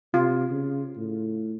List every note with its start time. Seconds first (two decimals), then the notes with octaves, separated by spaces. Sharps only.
0.14 C3 F4
0.51 C#3
0.97 A2